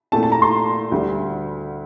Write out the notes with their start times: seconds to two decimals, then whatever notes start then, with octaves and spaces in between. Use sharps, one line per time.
0.12 A#2 A3 C4 A5
0.23 A5
0.32 A#5
0.42 C6
0.92 D2 D3 G3